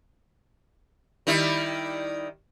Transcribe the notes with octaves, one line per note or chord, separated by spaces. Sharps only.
D#3 G3 E4